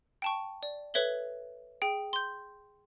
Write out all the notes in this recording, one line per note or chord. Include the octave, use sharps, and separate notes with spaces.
G5 A5 C#6
D5
A4 B4 C#5 E5 F#7 G7
G#4 G5
C6 G6